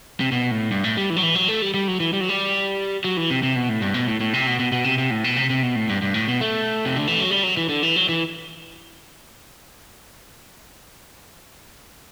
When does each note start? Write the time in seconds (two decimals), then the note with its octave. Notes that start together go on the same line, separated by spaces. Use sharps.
0.20 C3
0.32 B2
0.51 A2
0.71 G2
0.84 A2
0.97 G3
1.10 E3
1.16 F#3
1.23 E3
1.35 F#3
1.48 A3
1.62 G3
1.74 G3
1.88 F#3
2.00 E3
2.13 G3
2.21 F#3
2.29 G3
3.04 F#3
3.17 E3
3.30 C3
3.43 C3
3.56 B2
3.69 A2
3.82 G2
3.94 B2
4.07 A2
4.20 A2
4.34 C3
4.47 B2
4.60 B2
4.72 B2
4.84 C3
4.98 C3
5.11 A2
5.24 B2
5.37 C3
5.50 C3
5.63 B2
5.75 A2
5.89 G2
6.02 G2
6.14 A2
6.28 B2
6.41 A3
6.85 C3
6.96 D3
7.08 E3
7.20 F#3
7.31 G3
7.43 F#3
7.57 E3
7.69 D3
7.83 E3
7.96 F#3
8.09 E3